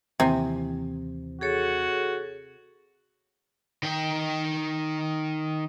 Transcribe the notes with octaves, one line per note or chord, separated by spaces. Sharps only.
D#2 C3 E3 C4 G#5
F#4 G#4 A4 C#5
D#3 G5